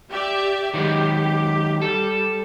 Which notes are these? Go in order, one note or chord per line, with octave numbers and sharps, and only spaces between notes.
G4 D5 E5
D#3 F#3 G#3 G4
G3 A4